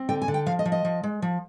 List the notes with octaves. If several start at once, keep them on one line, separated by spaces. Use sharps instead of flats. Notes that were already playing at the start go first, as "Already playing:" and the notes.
Already playing: C4
D3 G5
G#5
D3
G5
F3 F5
D#5
F3
D#5
F3
G#3
F3